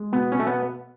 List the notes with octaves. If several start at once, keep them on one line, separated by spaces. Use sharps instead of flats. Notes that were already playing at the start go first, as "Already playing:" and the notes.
Already playing: G#3
B2 B3
B2 C#4
A3
B3